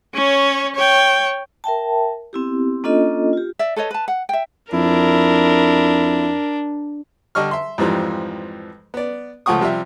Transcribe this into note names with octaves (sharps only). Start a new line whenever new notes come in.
C#4 C#5
C#5 G5
A#4 E5 G5 A5
B3 C4 E4 G4
A#3 C#4 D4 F4 A4 D#5
F4 G4
D5 E5
A4 B4 C#5 D#5
B4 A5
F#5
E5 G5
F2 D4 E4 A#4
D3 G3 D#5 C#6 F6
E5 C6
F2 G#2 E3 F3 G3
B3 D5
C#2 F3 A3 F#5 C#6 D#6
C3 F3 G3 E5